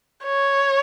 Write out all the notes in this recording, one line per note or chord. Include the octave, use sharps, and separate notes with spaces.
C#5